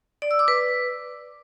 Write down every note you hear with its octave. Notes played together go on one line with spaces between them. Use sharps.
D5
E6
D6
B4